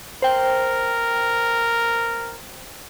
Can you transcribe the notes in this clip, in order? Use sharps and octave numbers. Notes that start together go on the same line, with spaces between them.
A#4 C5 G5